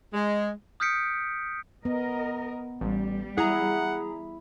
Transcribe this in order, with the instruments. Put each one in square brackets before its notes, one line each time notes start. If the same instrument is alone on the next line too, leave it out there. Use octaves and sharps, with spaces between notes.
[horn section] G#3
[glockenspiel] D#6 F6 G6 B6 C#7 D7
[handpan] B3 [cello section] A#4 D#5
[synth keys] A1 [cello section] G3
[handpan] E4 [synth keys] G#4 A#5 [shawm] F#5